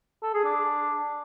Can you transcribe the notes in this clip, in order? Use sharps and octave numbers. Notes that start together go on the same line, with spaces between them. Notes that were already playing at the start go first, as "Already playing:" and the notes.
A4
G#4
D4